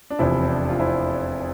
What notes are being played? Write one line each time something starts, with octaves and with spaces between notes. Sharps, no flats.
D4
F1 E2 C3 F3 C4 E4
C4
D4
F4
C4 E4